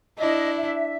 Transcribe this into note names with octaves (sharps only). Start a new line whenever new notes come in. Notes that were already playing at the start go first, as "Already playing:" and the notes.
D4 E4 D#5
E5